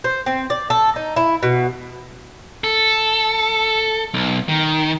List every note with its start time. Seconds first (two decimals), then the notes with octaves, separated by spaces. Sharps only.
0.04 C5
0.26 C4
0.50 D5
0.70 A4
0.96 D#4
1.16 E4
1.43 B2
2.64 A4
4.14 B1
4.49 D#3